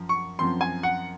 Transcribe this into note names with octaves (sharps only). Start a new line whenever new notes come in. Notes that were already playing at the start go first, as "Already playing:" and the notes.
Already playing: F#2 F3
C#6
F#2 F3 C4 C6
G#5
F#5